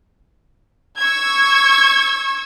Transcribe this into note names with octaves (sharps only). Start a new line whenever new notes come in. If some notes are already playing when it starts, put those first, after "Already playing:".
C#6 E6 G#6